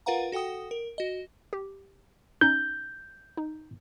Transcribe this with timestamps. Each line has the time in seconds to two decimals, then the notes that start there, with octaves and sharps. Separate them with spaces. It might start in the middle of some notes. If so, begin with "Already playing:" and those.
0.06 F4 A#4 B4 F5 F#5 A#5
0.32 F#4 A4 F#5 G5 D#6
0.71 A#4
0.98 F#4 D#5
1.53 G4
2.41 C#4 D#4 G6
3.37 D#4